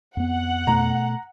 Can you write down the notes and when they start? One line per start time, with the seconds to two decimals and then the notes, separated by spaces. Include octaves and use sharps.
0.17 F2 B3 F#5
0.67 B2 A3 A#5